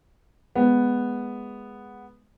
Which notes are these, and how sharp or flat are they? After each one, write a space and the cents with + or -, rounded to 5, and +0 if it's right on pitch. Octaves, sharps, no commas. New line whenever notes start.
G#3 +0 B3 +0